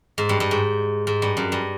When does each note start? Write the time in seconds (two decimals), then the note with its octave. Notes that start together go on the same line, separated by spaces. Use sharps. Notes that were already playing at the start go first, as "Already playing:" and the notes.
0.18 G#2
0.29 G2
0.40 G2
0.51 G#2
1.07 G#2
1.22 G2
1.37 F#2
1.52 G2